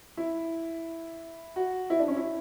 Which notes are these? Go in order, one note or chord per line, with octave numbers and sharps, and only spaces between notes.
E4
F#4
E4
D4
C#4
E4